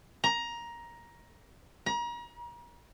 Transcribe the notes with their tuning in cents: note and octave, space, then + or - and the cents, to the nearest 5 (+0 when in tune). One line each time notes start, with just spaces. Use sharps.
A#5 +15
A#5 +35